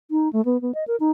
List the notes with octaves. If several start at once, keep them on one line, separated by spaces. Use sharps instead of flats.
D#4
A3
B3
B3
D#5
A#4
D#4